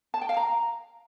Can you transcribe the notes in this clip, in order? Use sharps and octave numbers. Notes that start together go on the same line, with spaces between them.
A5
G5
F5
A#5